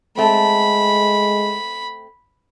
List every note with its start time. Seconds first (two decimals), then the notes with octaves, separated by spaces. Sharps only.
0.17 G#3 A3 C4 B5